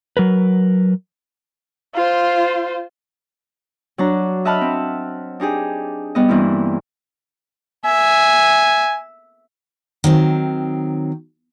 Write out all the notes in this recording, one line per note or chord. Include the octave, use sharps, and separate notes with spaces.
F#3 A#4 B4
F4 C5
F#3 D4 A#5
D#5 E5 F#5 A5 B5 F6
C4
D4 D#4 G4 G#4
G3 B3 D#5
G2 E3 A#3 C4 E4
E5 G#5
D#3 F#3 C4